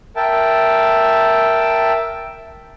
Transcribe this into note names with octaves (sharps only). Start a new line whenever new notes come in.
A#4 E5 G5 A5